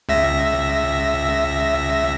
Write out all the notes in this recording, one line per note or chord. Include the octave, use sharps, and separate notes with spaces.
C#2 E5 A#6